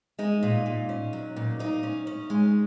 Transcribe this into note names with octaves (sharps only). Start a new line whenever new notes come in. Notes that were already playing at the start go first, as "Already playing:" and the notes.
G#3 D#4
A#2
A#2
C#4
F#3
A#2
A#3 D#4
C#4
C#4
G#3